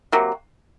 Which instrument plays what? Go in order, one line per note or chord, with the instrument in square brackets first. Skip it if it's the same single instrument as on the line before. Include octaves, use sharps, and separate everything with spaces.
[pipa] C3 F#3 A#3